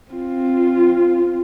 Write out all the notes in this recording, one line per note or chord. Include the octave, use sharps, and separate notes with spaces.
C4 F4